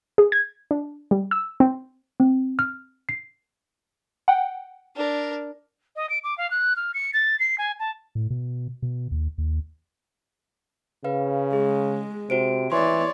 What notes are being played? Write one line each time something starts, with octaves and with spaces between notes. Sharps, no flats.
G#4
G#6
D4
G3
E6
C4
C4
F6
C7
F#5 G5
D4 A#4
D#5
D7
D6
F5
F#6
F6
C#7
A6
C7
G#5
A5
A2
B2
B2
D#2
D#2
C#3 B4 F5
G#3 G#4
C3 F#4 C5 D7
E3 C#5 D5 C6